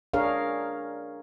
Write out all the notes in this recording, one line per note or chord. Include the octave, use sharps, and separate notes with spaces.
D4 G#4 A#4 C#5 F5